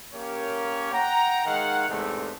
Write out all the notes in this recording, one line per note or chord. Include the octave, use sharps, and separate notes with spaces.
A#3 C#4 G4 C#5
F#5 G5 A#5
D#3 G#3 D#4 F5 F#5
E2 G#2 C3 G#3 A3